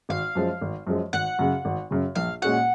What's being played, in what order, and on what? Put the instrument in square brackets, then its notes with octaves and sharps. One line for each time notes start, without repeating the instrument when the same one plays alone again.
[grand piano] G#1 [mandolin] F5
[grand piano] F#2 F3 G#3
G#1
F#2 F3 G#3
[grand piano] G#1 [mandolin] F#5
[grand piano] F#2 C#3
G#1
F#2 C#3
[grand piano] A#1 [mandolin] F5
[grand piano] A#2 G#3 C#4 F#4 [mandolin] F#5